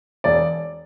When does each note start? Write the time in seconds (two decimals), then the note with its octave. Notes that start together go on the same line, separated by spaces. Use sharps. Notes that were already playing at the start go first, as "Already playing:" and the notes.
0.24 E1 D5